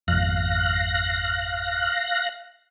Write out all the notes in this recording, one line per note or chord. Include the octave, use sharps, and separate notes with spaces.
G#1 F2 F5 F#6 A#6